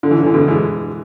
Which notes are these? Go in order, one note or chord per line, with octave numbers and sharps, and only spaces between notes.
D3
E3
D3
E3
B2 D3
E3 G#3